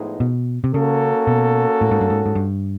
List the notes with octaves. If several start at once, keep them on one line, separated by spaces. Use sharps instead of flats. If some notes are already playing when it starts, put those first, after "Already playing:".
Already playing: A2 F3 G#3 B3 D#4
B2
C3
C#3 A#3 C#4 F#4 A4
B2
A2
G#2
G2
G#2
G#2
G2